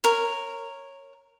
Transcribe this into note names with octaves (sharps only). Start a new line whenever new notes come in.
A#4 C#5